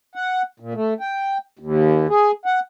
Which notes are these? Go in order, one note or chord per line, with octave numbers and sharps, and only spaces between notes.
F#5
A#2
A3
G5
D#2
G#4
F#5